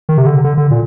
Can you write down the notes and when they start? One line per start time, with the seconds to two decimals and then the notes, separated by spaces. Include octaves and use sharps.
0.09 D#3
0.18 C3
0.27 D3
0.44 D3
0.57 D3
0.71 A#2